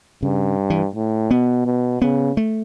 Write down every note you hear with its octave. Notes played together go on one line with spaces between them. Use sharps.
G2 C#3
E3
A2
B2 B3
B2
C#3 B3
A3